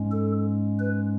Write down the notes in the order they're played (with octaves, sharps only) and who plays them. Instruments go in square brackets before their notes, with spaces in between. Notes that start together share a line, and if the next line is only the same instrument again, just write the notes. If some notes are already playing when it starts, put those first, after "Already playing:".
Already playing: [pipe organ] G#2 G#3 C#4
A4
B4